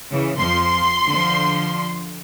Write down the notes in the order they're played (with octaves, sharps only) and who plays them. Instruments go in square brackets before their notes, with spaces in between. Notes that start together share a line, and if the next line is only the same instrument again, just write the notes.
[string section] C#3 E3
[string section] F2 F3 [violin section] C6
[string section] D3 F3